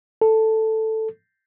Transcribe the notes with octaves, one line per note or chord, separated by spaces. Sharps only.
A4